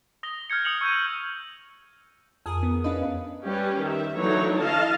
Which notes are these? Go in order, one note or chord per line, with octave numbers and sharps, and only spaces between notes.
D#6 A#6 G7
F6 G6 G#6 C#7
D#6 C#7 F7 F#7
C#6 E6 G6 G#6 D#7
F2 G#4 A#4 D#6
B3
C#4 D4 B4 D#5 F5
G3 C#4 G4 B4
D#3 E5
D3 E3 F#3 A#3 D#4 C#5
E4 D#5 F5 A5